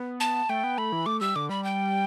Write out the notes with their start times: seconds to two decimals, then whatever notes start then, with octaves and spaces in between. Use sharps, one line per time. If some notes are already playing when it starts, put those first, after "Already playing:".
Already playing: B3
0.20 A5
0.49 A3 G5
0.64 B3
0.78 A3 B5
0.92 E3
1.06 A3 D6
1.21 G3 E6
1.36 D3 D6
1.49 G3 B5
1.64 G5